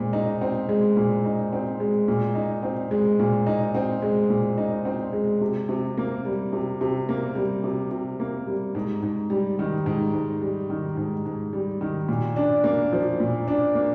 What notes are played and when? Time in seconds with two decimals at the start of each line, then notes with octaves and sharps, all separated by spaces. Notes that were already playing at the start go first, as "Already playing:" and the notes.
Already playing: A#2 G#3 C4
0.13 D#4
0.41 C4
0.69 G#3
0.97 A#2
1.25 D#4
1.53 C4
1.80 G#3
2.08 A#2
2.35 D#4
2.63 C4
2.91 G#3
3.19 A#2
3.46 D#4
3.75 C4
4.02 G#3
4.30 A#2
4.58 D#4
4.85 C4
5.13 G#3
5.41 C3
5.69 C3
5.98 A#3
6.25 G3
6.53 C3
6.81 C3
7.09 A#3
7.35 G3
7.64 C3
7.91 C3
8.20 A#3
8.47 G3
8.75 G#2
9.02 G#2
9.30 G3
9.59 D#3
9.86 G#2
10.13 G#2
10.42 G3
10.70 D#3
10.97 G#2
11.25 G#2
11.53 G3
11.81 D#3
12.09 A#2
12.36 D4
12.64 A#3
12.93 F3
13.20 A#2
13.48 D4
13.75 A#3